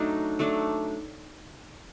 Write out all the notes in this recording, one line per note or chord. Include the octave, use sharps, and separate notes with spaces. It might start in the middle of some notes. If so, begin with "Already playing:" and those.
Already playing: F#3 A3 D4 D#4
F#3 A3 D4